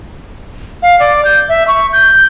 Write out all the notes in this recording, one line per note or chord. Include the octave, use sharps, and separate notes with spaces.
F5
D5
G6
E5
C#6
G6